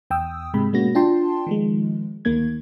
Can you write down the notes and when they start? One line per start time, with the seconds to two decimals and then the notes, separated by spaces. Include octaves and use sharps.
0.11 E2 G5 D#6 E6
0.54 G#2 C3 G#3 B5
0.73 B2 G#3 A#3 C#4 F#4 A#6
0.95 D4 F4 G5 A5 C6
1.47 D#3 F3 G#3
2.25 D2 D#3 A#3 G#6